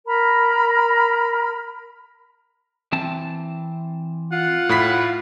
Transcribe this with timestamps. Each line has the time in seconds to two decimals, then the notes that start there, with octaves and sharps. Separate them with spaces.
0.06 A#4 A#5 B5
2.92 E3 C4 A5
4.32 F4 F#5
4.69 A2 B5 B6